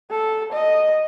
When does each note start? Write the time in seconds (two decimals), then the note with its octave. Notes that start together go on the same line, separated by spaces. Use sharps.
0.11 A4
0.53 D#5